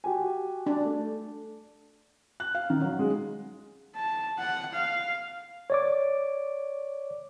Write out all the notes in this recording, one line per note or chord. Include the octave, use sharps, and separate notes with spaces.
F#4 G4 G#5
D4
A3
F#6
F5
D#3
F#3
G#3
A5
F#5
F5
C#5 D5 D6